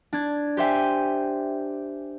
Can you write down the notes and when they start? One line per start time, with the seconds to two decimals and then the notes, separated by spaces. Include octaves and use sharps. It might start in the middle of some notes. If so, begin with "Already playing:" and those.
0.13 D4 G#6
0.57 G4 C5 E5 G5 G#5